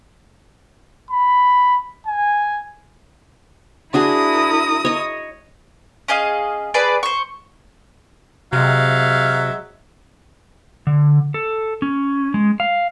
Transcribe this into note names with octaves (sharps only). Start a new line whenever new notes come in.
B5
G#5
D4 E4 F#4 G#4 A#4 D#6
C#5 D#5
C#4 G#4 D#5 F5
G#4 B4 D5 A5
C5 C#6
C3 F#3 G#3 E5 F5
D3
A4
C#4
G#3
F5